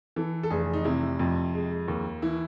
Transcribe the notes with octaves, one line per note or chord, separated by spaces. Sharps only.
E3 A4
A4
F1 G#4
D#4
C3 E4
F2
G#3
D#2
E3 E4